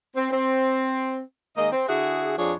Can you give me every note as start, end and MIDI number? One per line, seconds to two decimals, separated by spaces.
0.16 0.30 60
0.31 1.21 60
1.57 1.71 51
1.57 1.71 56
1.57 1.71 58
1.57 1.71 75
1.72 1.85 60
1.87 2.37 50
1.87 2.37 64
1.87 2.37 66
1.87 2.37 68
2.38 2.53 41
2.38 2.53 53
2.38 2.53 62
2.38 2.53 68
2.38 2.53 73